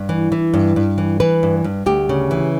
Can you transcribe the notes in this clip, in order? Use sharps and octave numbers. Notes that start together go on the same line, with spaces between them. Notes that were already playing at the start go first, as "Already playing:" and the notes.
Already playing: G2
E3
E3
G2
G2
E3
E3 B4
G2
G2
D2 G4
C#3
E3